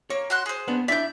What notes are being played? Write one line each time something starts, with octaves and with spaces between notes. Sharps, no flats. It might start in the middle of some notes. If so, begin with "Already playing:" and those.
A#3 C#5
F#4 C6 F#6
G#4 C5
B3 D4 B4
D4 E4 D5 E5 G6